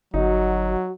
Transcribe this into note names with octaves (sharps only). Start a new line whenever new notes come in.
G1 F#3 D#4 F#4